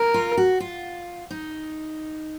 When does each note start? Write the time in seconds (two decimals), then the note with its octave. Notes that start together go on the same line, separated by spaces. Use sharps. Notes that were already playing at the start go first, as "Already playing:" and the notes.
Already playing: A#4
0.14 F4
0.37 F#4
0.60 F4
1.31 D#4